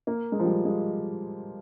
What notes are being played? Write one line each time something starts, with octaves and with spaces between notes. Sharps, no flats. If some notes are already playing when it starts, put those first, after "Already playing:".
A#3
G#3
F3
G3
G#3